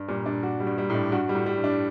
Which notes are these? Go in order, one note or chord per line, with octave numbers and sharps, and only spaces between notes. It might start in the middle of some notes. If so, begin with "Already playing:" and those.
Already playing: G2
A#2 G3
A#2 D4
F#4
G3
G2
G3
A2
D4
G2 F#4
G3
A2
G3
G2
D4